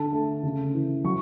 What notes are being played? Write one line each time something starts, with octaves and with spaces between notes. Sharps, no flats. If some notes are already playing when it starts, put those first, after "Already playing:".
Already playing: D3 A5
A3
C#3
E3
F#3 C#6